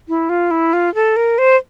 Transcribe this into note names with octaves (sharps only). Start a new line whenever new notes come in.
E4
F4
E4
F4
A4
A#4
C5